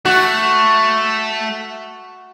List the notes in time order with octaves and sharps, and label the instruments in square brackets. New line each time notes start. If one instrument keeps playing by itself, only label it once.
[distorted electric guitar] A3 [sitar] F#4